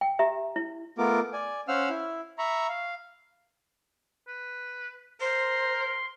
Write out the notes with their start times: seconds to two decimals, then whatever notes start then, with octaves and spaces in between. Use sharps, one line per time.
0.01 G5
0.19 G4 E5 A#5
0.56 E4
0.98 A3 B3 F4 A#4 D6
1.33 D5 G#5
1.68 C#4 C5 F5 F#5 E6 F6
1.89 E4
2.38 E5 A#5 B5 C#6
2.69 F5
4.28 B4
5.21 A#4 C5 C6